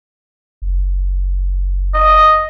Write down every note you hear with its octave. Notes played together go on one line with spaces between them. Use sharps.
F#1
D#5